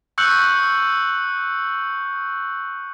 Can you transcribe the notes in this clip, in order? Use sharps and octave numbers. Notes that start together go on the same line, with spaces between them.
C#6 E6 F#6 G6 C#7 F#7